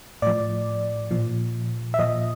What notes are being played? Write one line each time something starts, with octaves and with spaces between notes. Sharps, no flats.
A2 F3 D5
A#2 F3
E5
A#2 F3 D#5